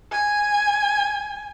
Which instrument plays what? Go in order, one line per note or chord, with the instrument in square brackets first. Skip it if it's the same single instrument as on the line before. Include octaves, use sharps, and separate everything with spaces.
[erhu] G#5